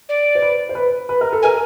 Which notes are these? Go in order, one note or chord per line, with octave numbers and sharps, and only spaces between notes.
D5
C5
B4
C5
B4
B4
A#4
A4
A#4 G#5